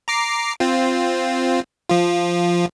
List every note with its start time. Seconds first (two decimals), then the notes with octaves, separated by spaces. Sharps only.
0.08 A#5 D6 C7
0.60 C4 F4
1.89 F3 F4